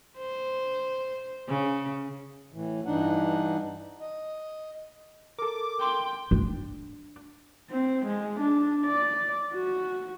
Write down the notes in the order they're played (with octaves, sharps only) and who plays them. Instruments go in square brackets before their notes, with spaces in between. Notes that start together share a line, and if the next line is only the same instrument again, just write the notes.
[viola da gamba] C5
C#3
[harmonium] A2 E3
G2 E3 D4 D#4 F#5
D#5
[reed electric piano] A4 A#4 [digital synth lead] D6
[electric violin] G5 [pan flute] C6
[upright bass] D4
[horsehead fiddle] C4
G#3
D4
D5
F#4